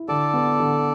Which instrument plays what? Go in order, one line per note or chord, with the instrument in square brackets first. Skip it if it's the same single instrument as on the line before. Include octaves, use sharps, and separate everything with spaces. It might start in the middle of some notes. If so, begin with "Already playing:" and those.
Already playing: [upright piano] E4
[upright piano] D3 [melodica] A4 D5
[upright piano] B3
D3